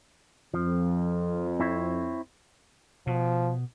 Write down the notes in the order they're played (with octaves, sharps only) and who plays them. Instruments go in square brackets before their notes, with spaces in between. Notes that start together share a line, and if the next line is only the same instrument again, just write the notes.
[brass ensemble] F2 [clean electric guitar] F3
[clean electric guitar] C4 E4 C#5
[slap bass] B2 [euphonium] F3